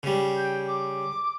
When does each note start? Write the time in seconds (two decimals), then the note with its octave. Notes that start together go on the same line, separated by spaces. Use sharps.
0.03 C#3 G3
0.36 G5
0.68 D6